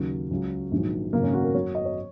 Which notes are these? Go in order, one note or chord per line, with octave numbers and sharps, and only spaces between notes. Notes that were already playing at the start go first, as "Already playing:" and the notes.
Already playing: D#2 C#3 F#3 C#4
C#2 C#3 F#3
A#1 G#2 D#3 F#3
G#1 F#2 C#3 F#3 A#3
C#4
F#4
A#4
F#1 F#2 F#3 C#5
D#5
C#5